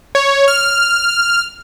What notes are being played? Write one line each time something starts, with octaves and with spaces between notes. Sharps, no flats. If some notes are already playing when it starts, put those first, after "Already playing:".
C#5
F6